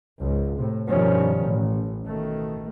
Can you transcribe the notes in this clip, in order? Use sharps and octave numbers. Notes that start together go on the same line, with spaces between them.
C#2 G#2
A2 C3
G2 B2 D#3 F3 G3 C#4
A1
B2 D#3 A3